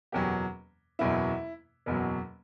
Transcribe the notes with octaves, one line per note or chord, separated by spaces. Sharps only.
F#1 E2 B2 F#3 G4
F#1 E2 B2 F#3 E4
F#1 E2 B2 F#3